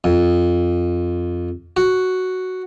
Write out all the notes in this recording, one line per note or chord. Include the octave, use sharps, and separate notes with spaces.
F2
F#4